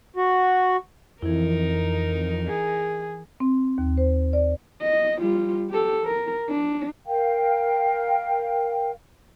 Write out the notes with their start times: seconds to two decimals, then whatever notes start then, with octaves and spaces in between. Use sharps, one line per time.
0.16 F#4
1.22 F2 E3 D#4 E4 A#4
2.48 G#4
3.40 C4
3.78 D#2
3.97 C5
4.33 D5
4.82 D#5
5.20 G3 F4
5.70 G4 A4
6.04 A#4
6.49 D4
7.07 A#4 F5 G5